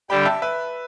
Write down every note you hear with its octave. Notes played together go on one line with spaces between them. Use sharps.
D3 G3 D4 G4 G5 B5
G5
E5 A5
B4 E5